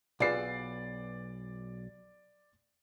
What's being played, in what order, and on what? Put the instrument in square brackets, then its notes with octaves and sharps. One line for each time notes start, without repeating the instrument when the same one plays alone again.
[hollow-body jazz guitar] B1 E5 [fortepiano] F4 G#4 B4 [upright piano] D5 C7